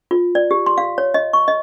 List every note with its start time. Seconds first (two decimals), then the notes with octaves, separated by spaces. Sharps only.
0.11 F4
0.35 D5
0.51 G4
0.66 C6
0.78 F5
0.98 C#5
1.14 D#5
1.33 C#6
1.48 D#5